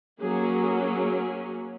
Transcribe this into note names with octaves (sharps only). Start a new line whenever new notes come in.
F#3 A#3 C#4 G#4
G#4